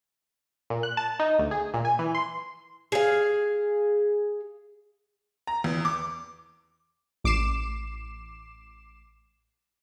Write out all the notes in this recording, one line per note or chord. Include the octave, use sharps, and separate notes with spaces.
A#2
F#6
A5
D#4
D2
G#4
A#2
G#5
E3
C6
G#4 F5
A#5
E2
D6
A1 D6 C7 E7